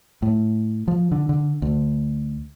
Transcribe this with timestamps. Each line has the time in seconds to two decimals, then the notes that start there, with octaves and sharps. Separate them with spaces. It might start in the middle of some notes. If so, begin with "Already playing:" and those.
0.22 A2
0.88 F3
1.12 D3
1.29 D3
1.62 D2